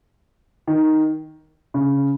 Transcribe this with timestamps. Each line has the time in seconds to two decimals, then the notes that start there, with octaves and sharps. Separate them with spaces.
0.67 D#3
1.74 C#3